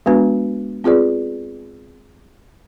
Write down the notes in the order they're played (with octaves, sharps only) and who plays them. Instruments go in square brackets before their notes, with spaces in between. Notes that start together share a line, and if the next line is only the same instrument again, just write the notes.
[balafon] G#3 B3 D4 F#4 B4
C4 F4 G#4 B4 D5